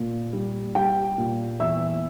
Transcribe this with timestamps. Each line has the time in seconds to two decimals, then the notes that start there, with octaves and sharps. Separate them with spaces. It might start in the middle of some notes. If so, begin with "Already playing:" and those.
Already playing: A#2
0.33 G3
0.75 G3 G4 G5
1.18 A#2
1.60 E2 E5 E6